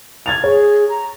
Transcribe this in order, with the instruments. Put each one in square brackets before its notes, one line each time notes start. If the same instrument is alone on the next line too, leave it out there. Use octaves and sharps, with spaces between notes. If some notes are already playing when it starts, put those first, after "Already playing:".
[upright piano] G#6 A6 F7
[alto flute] G#4 [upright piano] C#5
[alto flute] A#5